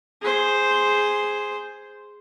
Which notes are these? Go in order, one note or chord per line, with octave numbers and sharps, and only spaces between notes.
G#4 C5